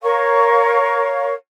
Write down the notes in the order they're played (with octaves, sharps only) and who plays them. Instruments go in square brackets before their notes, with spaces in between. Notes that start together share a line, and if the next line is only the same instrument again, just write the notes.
[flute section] A#4 C#5 F5 C#6